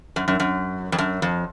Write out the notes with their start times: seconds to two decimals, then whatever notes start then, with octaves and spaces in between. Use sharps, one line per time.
0.16 F#2
0.28 F#2
0.40 F#2
0.92 F2
0.98 F#2
1.22 F2